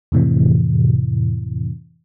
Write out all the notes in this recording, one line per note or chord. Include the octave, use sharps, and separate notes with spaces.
F2 A2 C3 E3